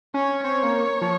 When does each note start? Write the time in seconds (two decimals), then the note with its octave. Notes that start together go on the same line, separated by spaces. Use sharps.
0.14 C#4 C#5
0.44 C4 C#5
0.63 A#3
1.01 F3